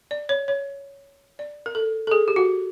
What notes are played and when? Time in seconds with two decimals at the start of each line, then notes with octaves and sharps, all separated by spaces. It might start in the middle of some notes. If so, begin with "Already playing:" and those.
0.11 D5
0.29 C#5
0.48 C#5
1.39 D5
1.66 A#4
1.75 A4
2.07 A4
2.11 G#4
2.28 G4
2.36 F#4